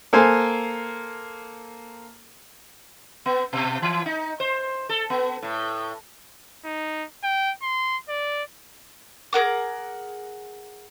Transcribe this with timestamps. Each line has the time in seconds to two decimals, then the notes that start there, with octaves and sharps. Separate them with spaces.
0.13 A#3 A4 C5 G#5
3.26 B3
3.53 B2
3.82 E3
4.06 D#4
4.40 C5
4.89 A4
5.10 B3
5.42 A2
6.65 D#4
7.24 G5
7.63 C6
8.09 D5
9.33 G#4 A#4 F#5 D6